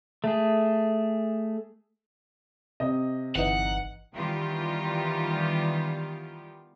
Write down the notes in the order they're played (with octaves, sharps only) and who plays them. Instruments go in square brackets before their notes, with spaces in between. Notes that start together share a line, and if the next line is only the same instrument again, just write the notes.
[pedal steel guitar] A3 G#4
[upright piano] C3 [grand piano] D#5
[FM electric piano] G1 E3 D#4 [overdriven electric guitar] F#5
[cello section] D#3 E3 G3 B3 F4 G4